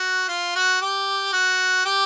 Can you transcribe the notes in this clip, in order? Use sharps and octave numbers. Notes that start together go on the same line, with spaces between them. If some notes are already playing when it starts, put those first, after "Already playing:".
Already playing: F#4
F4
F#4
G4
F#4
G4